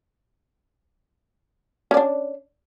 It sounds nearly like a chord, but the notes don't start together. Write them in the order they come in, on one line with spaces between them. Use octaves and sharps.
C#4 D5 D4